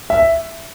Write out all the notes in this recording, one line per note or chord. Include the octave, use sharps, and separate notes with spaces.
E5